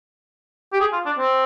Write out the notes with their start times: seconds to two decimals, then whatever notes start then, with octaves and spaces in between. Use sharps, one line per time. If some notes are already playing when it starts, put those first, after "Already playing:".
0.73 G4
0.80 G#4
0.93 F4
1.06 D4
1.18 C4